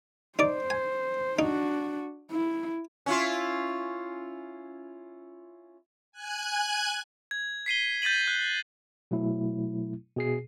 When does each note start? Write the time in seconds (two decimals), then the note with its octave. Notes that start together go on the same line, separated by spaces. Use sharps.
0.39 D#4 C5 D5
0.70 G#5
1.39 D4 D#4 F#4
2.31 E4
3.06 C#4 E4 F4
6.12 G#5 F#6 G#6
7.31 G#6
7.66 B6 C7 D#7 G7
8.02 G6 A6 B6 D#7 F#7
8.28 F#6
9.11 B2 F#3 A3 E4
10.17 B2 G#4 C7